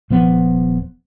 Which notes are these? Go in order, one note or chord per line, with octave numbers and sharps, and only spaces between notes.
D#1 F3 B3